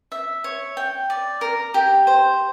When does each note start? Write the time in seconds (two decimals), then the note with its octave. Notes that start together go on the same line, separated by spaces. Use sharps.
0.12 E5
0.44 C#5
0.77 G5
1.10 D5
1.41 A#4
1.74 G4
2.07 C5